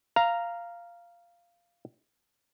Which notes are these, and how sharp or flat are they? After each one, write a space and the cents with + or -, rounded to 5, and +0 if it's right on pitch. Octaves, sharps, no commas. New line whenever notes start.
F5 -10 A#5 +0